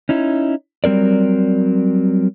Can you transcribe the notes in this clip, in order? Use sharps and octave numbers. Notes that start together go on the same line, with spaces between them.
C#4 D#4 E4
F#3 G3 C4 A#4 D5